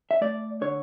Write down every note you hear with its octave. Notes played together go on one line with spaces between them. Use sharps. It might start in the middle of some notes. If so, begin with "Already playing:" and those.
E5
A3 D5
D3 C#5